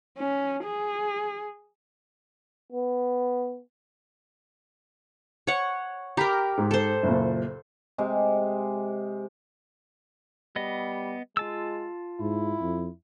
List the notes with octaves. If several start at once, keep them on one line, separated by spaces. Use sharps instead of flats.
C#4
G#4
B3
C#5 F#5
G4 A#4 A#5 B5 B6
G#2
A4 C5
F#1 A#2
C3 G#3
G3 B3 D#5
G#3 F4 A5 E6
G#2 E4
F2